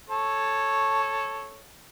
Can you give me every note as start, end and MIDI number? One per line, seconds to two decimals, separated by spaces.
0.10 1.60 69
0.10 1.60 73